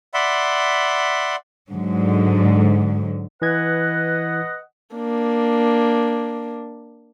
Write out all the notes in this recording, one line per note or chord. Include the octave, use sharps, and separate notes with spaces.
D5 E5 F#5 B5 C6
G#2 D3 F#3
E3 B4 D#5 F#5 G#6
A#3 D4